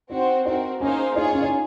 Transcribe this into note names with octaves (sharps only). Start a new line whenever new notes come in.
C4 D#4 F#4 C5
C4 D#4 F#4 A#4
A#3 C#4 D#4 G#4 C5 F5
D#4 F4 G#4 C#5
C#4
D#4